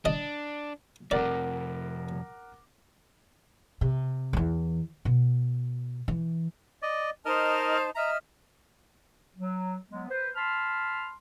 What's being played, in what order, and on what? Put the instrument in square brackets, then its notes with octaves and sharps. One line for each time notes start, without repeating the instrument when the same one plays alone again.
[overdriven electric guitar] D4 [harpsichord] D#5
[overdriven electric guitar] F2 C3 [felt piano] A#4 F#5 D6 [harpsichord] D5
[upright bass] C3
E2 E3
B2
E3
[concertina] D5 D#5
[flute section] D#4 C5 A5 [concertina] A#4 D#5 F6
[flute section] D#5 E5 F6 [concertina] A#5
[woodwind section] F#3
F#3 G#3 B3
B4 C5
A5 B5 C6 F6